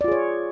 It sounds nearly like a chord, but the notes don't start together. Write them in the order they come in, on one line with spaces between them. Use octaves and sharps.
D5 F4 G#4 C#5